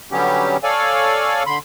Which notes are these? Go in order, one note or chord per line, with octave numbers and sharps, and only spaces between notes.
D3 F#3 G3 B3 C#4 G4
A4 C#5 D5 F5 G#5
D3 B5 C6